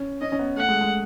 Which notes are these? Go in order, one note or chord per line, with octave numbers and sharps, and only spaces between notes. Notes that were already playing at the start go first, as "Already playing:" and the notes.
Already playing: C#4
C#4 D#5
C#4
B3
A3 F#5
G#3
G#3